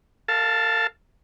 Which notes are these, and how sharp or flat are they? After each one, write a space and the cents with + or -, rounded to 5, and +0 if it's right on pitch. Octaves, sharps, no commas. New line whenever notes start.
A#4 -45 F5 +0 A5 +0